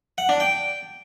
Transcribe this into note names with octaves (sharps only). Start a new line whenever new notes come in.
F#5
D4
G5